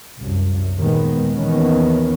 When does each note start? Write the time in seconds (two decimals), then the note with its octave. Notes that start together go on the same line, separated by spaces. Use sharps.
0.19 C2 F#2
0.76 D#2 A#2 D#3 G#3 B3
1.33 D#2 D#3 E3 B3 C#4